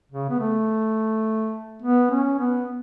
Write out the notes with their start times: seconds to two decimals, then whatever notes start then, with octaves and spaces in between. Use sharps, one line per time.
0.11 C#3
0.30 B3
0.40 A3
1.82 B3
2.11 C#4
2.39 B3